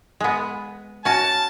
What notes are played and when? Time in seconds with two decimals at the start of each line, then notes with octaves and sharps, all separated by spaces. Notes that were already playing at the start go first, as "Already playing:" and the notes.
0.20 G#3 B3
1.05 C#4 F#4 A5